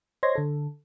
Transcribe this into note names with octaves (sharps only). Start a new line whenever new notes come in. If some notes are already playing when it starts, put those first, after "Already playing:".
C5 C#5 D#5 C6 G#6 A#6
D3 A4